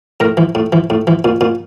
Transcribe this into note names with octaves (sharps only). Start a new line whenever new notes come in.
A2 A#4
E3
A2
E3
A2
E3
A#2
A#2